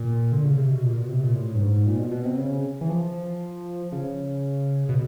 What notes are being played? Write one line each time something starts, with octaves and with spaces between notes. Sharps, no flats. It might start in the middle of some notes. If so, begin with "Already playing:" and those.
Already playing: A#2
D3
C#3
C3
B2
A#2
B2
C3
A#2
A2
G2
G#2
A#2
B2
B2
C3
C#3
E3
F3
C#3
B2